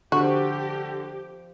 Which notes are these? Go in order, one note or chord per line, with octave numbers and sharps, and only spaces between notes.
D3 F3 C4 F#4 G4